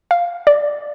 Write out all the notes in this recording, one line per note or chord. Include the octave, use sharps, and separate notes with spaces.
F5
D5